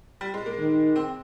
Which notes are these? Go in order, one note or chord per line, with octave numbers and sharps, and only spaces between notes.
G3
G#3
A#3
D#3
C4